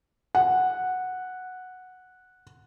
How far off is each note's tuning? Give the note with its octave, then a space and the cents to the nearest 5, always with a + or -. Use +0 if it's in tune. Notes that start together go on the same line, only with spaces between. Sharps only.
F#5 -5